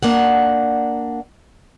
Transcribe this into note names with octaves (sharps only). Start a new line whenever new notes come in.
A#3 D4 F#5